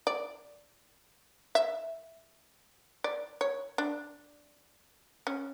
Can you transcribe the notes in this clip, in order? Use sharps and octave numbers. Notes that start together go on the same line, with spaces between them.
D5
E5
D5
C#5
D4
C#4